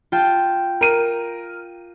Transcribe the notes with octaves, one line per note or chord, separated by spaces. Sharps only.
F4 G5 A5
A#4 D#7